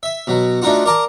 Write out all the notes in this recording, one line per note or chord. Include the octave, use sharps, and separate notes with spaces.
E5
B2 F#3
A3 D4 D#4 F4 F#4
A#4 D5 F5 A5 A#5